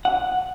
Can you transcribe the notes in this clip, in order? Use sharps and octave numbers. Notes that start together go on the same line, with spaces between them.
F#5